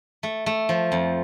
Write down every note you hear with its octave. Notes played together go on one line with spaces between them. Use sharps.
A3
A3
F3
F2